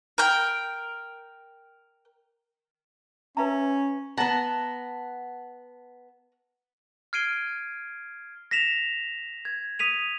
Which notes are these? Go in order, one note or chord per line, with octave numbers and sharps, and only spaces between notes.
A#4 G5
C#4 B4 E5 A#5
B3 F#5 A5 A#5
F6 G#6 C7 D7 D#7 G7
A#6 B6 E7 F7
G#6
D#6 B6 D#7 F7